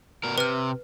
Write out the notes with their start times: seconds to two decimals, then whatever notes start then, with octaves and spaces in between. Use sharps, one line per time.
0.24 B2 A#4
0.38 C3 B4 F6